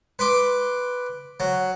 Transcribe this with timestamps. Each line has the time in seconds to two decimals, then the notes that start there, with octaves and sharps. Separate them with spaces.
0.19 B4 C6 D6
1.40 F#3